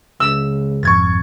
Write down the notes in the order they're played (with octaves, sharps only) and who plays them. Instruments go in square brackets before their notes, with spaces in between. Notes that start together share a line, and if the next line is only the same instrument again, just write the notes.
[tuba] C#2 [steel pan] E6
[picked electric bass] G#1 F2 [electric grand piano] C#6 G#6 A6